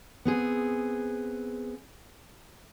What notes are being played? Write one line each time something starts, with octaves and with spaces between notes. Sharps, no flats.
B3 C4 G#4